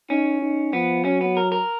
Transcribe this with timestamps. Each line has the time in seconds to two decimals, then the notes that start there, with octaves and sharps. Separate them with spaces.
0.10 C#4 D#4
0.42 D#4
0.73 F3 B3
1.04 F#3 C#4
1.21 B3
1.37 A#4
1.52 A#4